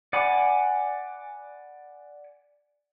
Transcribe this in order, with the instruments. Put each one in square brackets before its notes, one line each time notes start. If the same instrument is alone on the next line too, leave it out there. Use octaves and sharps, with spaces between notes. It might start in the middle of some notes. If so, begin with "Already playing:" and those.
[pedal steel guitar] D5 F#5 G#5 B5 D6